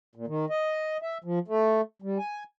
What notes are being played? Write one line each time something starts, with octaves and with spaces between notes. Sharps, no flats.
A#2
D#3
D#5
E5
F3
A3
G3
G#5